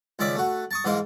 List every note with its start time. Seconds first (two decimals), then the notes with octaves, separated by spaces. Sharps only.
0.19 C#2 D#3 C#4 D5 E5 D6
0.36 A3 F#4
0.71 A5 C#6 D#6
0.84 G#2 E3 G#3 D#4 A#4 F5